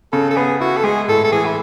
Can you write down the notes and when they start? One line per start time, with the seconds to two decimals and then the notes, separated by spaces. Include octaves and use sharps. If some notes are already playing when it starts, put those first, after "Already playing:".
0.12 C#3 A4
0.30 A4
0.36 B3 G#4
0.60 E4 F#4
0.77 A4
0.84 G#3 G#4
1.08 A2 A4
1.24 A4
1.32 E3 G#4
1.45 E4